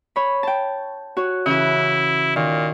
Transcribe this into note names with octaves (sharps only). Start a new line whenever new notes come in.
C#5 B5
G5 A5
F#4 C#5
C#3 E3 E4 F#4
A#2 D#3